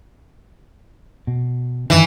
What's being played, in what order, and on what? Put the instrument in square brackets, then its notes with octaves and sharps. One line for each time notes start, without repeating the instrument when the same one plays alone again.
[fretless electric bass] B2
[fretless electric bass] F#2 D#3 [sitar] E3